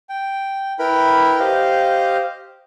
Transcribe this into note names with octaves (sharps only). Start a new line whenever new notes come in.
G5
E4 A#4 B4 G5 B5
G4 C5 D#5 F5